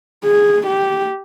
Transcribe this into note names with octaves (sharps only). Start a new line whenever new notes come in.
G#4
G4